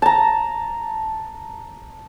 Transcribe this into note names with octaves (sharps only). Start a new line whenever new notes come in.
A5 A#5